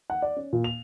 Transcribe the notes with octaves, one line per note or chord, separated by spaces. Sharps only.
F#5
D5
C#4
A#2
F7